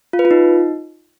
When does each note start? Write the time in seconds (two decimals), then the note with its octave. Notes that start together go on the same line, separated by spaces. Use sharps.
0.13 F4
0.19 B4
0.25 F4
0.31 D#4